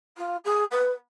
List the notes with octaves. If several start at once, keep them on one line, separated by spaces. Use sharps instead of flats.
F4
G#4
B4